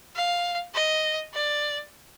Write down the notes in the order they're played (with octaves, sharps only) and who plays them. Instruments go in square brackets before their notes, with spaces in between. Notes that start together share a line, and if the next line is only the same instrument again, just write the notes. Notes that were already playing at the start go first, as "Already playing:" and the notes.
[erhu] F5
D#5
D5